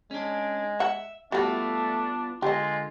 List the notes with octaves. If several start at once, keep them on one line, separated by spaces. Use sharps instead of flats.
G#3 C#4 D4
E5 F#5
G3 A3 B3 D4 F4 F#4
D3 G#3 F4 G4 D#5